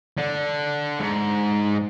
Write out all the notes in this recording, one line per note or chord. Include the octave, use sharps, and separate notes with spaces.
D3
G#2